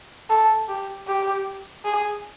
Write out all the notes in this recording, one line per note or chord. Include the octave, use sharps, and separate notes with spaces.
A4
G4
G4
G#4